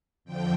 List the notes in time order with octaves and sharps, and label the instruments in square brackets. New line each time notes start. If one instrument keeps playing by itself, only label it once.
[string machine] F2 D3 F3 G5